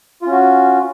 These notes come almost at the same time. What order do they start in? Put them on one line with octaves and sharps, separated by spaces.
F4 C#4 F#4